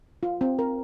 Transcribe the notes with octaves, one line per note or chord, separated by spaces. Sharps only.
F4
C4
A#4